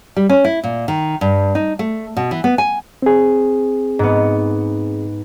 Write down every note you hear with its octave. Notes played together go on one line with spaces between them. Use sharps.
G3
C#4
E4
A#2
D#3
G2
D#4
A3
B2
E3
B3
G#5
C4 G#4
G#2 B3